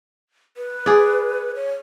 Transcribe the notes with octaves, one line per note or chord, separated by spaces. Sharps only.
B4
G#4 D5
C#5